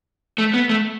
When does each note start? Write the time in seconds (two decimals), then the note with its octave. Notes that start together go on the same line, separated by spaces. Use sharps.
0.38 A3
0.54 B3
0.69 A3